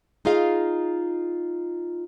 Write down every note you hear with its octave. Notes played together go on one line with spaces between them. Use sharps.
D#4 F4 G#4 D#5 F5